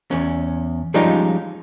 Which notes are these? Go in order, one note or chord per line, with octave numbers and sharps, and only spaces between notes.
E2 C#4
F3 G3 G#3 C#4 D#4 F4